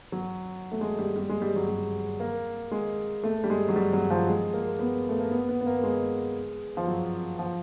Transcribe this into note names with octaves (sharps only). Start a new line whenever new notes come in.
F#3
A3
G#3
G3
G3
G#3
G3
F#3
G3
A#3
G#3
A3
G3
G#3
F#3
G3
F#3
F3
G#3
A#3
B3
A3
A#3
B3
B3
B3
A#3
G#3
F3
F#3
F3